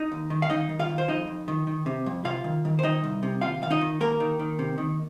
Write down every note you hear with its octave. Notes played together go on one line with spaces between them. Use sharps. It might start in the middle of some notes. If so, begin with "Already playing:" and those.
Already playing: D#4 D#5
D#2
D#3
F5
D#3 D#4 D#5
D#3
F4 F5
D#3
C5
F2 D#4 D#5
F2
D#3
D#3
C3
F2
C3 F4 F5
D#3
D#3
C5
D#3 D#4 D#5
C2
C3
D#2 F4 F5
D#3 F5
D#4 D#5
D#3
D#2 A#3 A#4
D#3
D#3
C3
D#3